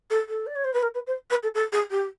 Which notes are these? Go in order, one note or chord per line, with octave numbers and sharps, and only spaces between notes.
A4
A4
D5
C#5
C5
B4
A#4
B4
C5
B4
A4
A4
G#4
G4